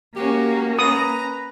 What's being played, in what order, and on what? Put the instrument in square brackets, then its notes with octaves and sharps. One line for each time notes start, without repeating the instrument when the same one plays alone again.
[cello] A#3 [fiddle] C#4 F#4 [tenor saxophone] G4
[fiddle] C#4 A#5 [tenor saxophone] B4 [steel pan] D#6